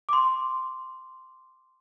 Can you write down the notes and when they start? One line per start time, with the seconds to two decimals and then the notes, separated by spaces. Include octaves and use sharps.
0.09 C6 D6